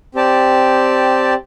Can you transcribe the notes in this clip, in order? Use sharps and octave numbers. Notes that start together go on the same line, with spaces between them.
C4 G4 D5 A5